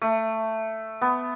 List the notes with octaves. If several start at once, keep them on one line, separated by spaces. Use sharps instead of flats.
A3
B3